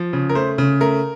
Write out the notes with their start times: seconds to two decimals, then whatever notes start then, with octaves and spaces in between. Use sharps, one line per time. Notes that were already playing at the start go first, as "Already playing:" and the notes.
Already playing: F3
0.13 C#3
0.29 A#4
0.35 A3 C5
0.58 C#3
0.81 A3 A#4